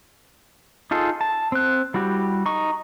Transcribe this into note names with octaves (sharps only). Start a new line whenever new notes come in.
D#4 F4 G#4 A4
A5
C4 F#6
G3 E4 F#4 G4
D#4 C#6